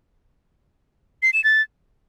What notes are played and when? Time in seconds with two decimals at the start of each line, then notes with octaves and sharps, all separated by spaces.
1.23 C7
1.33 E7
1.44 A6